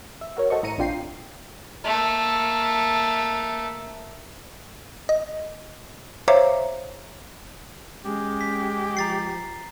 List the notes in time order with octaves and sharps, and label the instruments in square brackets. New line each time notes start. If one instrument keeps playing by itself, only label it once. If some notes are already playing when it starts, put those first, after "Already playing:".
[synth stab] E5
F#4 A#4 C#5
F#4 A4 C5 D#5 C#6
A2 E3 A#5 C#7 D#7
A#1 C3 D4 F4 G5 C7
[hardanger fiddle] A3 A#3
[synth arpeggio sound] D#5
C5 C#5 E5 F5 A#5 D6
[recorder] G#3 [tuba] C#4 [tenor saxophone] G4
[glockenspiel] B6
[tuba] F3 [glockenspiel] A#5 A6 C7